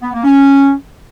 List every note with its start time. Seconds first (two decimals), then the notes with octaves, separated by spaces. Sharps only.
0.02 B3
0.13 A#3
0.24 C#4